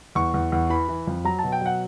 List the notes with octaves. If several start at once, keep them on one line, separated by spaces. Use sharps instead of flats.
E2 C#6
E2
E2
E3 B5
E3
F2
F#3 A#5
B2 A5
G5
F#3 F#5